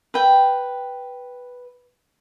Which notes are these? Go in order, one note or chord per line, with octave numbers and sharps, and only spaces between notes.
B4 G5